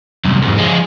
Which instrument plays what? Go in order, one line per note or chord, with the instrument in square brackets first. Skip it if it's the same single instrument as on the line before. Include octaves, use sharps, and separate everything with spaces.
[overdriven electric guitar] C2 F#2
E2 G#2
F3 G#3